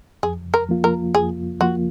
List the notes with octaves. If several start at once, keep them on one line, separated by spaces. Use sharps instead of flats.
F2 G#4
A#4
F3 A#3 F4
A#4
F2 G#4
F3 A#3 F4 F#4